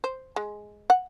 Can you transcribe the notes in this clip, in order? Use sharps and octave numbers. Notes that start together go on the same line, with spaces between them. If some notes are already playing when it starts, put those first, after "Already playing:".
C5
G#3
F#5